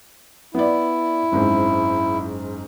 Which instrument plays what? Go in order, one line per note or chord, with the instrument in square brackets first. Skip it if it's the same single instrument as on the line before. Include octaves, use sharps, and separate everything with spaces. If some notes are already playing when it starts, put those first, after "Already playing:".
[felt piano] B3 D5 [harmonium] E4
[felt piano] F#1 G#2 C4